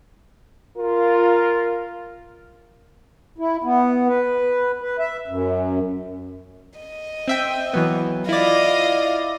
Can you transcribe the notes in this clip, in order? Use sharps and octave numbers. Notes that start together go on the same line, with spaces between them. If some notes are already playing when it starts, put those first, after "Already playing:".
F4 A#4
E4
B3
B4
B4
E5
F#2
D#5
C4 E5 G5
E3 F#3 B3
E4 F4 D5 D#5 F5